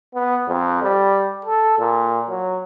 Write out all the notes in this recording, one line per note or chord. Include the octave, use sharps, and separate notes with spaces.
B3
F2
G3
A4
A#2
F#3